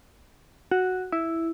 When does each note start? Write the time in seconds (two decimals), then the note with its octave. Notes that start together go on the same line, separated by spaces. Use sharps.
0.72 F#4
1.12 E4